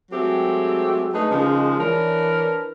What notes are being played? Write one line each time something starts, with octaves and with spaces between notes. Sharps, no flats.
F#3 G#3 A3 C4 G4 A4
A3 D4 D#4 G#4 B4
C#3 F3 G#3 A#3 C#4 D#4
E3 D4 A#4 B4 C#5 D5